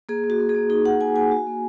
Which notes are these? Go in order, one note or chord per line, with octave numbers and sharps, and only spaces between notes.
A#3 G#4
A#3
F#4
A#3
G#4
A#3
D#4 G#4
F#4 F#5
A#3 G#5
A#3 G#5
F#4
A#3